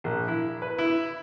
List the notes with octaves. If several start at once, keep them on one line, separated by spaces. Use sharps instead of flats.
A#1
E4
B4
E4